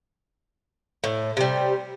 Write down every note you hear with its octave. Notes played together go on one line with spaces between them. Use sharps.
A2
C3 G3